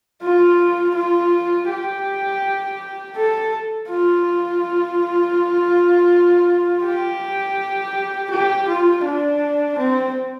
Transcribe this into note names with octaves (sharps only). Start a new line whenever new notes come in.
F4
F4
G4
A4
F4
G4
G4
F4
D4
C4